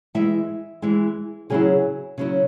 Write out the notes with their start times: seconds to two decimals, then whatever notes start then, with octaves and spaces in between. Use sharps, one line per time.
0.15 E3 G#3 E4 E5
0.82 E3 G#3 E4
1.50 C#3 F#3 C#4 E4 G#4
2.18 C#3 F#3 C#4 E4